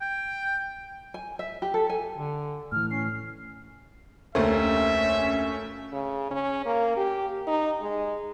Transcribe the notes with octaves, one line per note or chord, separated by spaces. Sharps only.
G5
G#5
E5
G4
A4
G#5
D3
A2 E3 F6
C#4 C7
F1 D2 A3 A#3 C#4 C5 E5
C#3
C#4
A#3
G4
D#4
G#3